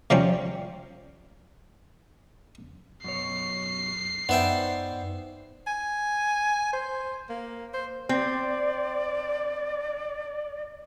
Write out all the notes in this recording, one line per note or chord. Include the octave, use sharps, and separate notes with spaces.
C3 F3 G3 C4 C#4
F#2 B2 C#5 C7
F#2 B3 D#4 C5 D5 E5 G5
G#5
C5
A#3
C5
C4 D5